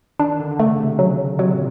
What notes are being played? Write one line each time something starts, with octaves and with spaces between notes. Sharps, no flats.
D#3 D4
D3
D3
C#3 A3
C3
C#3 F#3
C3 F#3
A#2